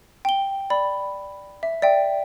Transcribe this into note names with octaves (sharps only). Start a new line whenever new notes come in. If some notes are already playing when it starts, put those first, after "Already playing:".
G5 G7
D5 B5
E5
D5 E5 G5